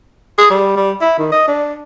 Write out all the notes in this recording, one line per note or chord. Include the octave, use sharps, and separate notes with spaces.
G#4
G3
G3
E4
D#3
D#5
D4